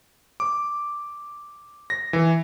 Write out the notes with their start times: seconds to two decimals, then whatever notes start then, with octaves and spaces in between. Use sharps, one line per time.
0.40 D6
1.90 A#6
2.13 E3